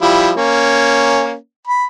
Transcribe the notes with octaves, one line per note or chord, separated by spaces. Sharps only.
F3 G3 E4
A#3 C#4
B5